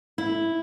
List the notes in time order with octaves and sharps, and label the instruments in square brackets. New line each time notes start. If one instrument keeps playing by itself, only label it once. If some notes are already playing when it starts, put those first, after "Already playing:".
[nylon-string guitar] E4